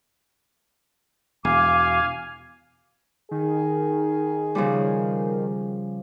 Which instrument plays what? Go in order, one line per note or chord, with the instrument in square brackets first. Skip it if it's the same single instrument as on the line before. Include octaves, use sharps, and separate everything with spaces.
[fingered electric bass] E1 [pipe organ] F5 G#5 [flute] D6
[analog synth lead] D#3 [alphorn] G#4
[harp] C#3 F3 G3